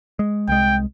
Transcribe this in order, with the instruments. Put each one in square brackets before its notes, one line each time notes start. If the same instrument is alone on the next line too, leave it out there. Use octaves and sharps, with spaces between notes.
[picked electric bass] G#3
[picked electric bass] C2 G#3 [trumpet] G5